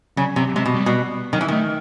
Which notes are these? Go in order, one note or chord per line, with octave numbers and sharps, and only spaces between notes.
C#3 F#3
C3 F#3
C3 G#3
B2
G3
B2
D#3 F#3
E3
D#3 A3